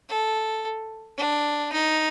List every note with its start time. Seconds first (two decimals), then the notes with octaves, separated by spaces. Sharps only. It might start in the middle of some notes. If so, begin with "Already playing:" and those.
0.09 A4
1.18 D4
1.72 D#4